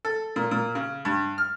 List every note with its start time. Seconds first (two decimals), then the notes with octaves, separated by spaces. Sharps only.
0.05 A4
0.36 A#2
0.51 A#2
0.75 C#3
1.05 G2
1.38 F6